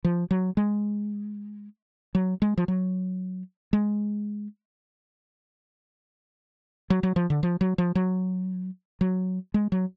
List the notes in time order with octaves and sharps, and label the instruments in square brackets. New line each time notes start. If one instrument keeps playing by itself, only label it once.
[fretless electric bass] F3
F#3
G#3
F#3
G#3
F3
F#3
G#3
F#3
F#3
F3
D3
F3
F#3
F3
F#3
F#3
G#3
F#3